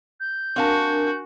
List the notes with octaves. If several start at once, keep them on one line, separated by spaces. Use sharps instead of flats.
G6
C4 D4 F#4 A#4 F5 G#5 A5